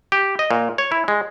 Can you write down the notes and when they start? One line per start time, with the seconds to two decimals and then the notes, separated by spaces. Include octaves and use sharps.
0.12 G4
0.39 D#5
0.51 A#2
0.78 C#5
0.92 E4
1.08 G#3